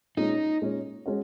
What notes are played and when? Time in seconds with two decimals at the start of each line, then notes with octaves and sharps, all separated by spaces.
0.17 A#2 G#3 C#4 D#4
0.62 A#2 G#3 C#4
1.06 G#3 C#4 F#4